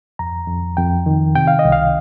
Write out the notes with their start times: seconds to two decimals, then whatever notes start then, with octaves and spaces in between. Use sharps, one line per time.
0.19 F2 A#5
0.48 F2
0.77 F2 G5
1.06 D#3
1.35 C3 G5
1.48 F5
1.59 D#5
1.65 C2
1.72 F5